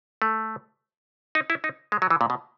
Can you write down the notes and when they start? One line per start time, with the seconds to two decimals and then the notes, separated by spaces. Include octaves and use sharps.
0.22 A3
1.35 D#4
1.50 E4
1.64 D#4
1.92 G#3
2.02 F#3
2.10 E3
2.21 A#2
2.30 B2